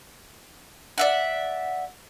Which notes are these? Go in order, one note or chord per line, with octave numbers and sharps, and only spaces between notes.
D5 E5 F#5